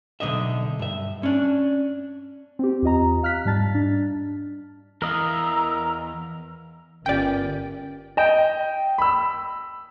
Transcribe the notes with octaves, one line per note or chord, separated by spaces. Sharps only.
B1 A#2 D3 D#5 E5
G2 E5
C#4 D4
C4 G4
E2 F4 D#5 A#5
F5 F6 F#6 B6
G#2 G3 A5 A6
D4
E2 E3 A#4 D#5 F5 A#5 E6
G1 C#4 F4 G4 A#4 D5 G5
D#5 G5
B5 E6